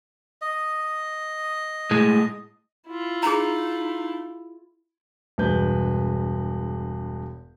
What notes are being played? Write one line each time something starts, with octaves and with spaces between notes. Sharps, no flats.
D#5
A2 G#3
E4 F4
D#4 G#4 A#5
E1 G2 G#3 B4 G6